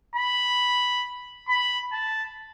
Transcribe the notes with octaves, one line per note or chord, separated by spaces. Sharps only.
B5
B5
A5